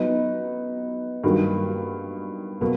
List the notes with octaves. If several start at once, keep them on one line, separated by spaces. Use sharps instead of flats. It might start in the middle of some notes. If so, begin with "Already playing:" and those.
Already playing: F#3 B3 D#4
G2 D#3 F#3 A#3
B2 F#3 A#3